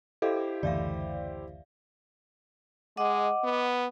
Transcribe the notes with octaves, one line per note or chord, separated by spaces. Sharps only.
E4 G4 A4 C5 D#5 F5
F#1 D2 E3 D5 E5 F5
G#3 D#5 F#5 D6
B3